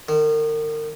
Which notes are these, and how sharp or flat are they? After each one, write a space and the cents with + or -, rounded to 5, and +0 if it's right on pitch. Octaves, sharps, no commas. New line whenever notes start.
D#3 -35